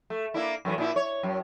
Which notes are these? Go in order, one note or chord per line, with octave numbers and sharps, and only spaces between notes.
A3
A#3 D4 E4
F#2 A2 E3
A#2 D4 E4
C#5
F#2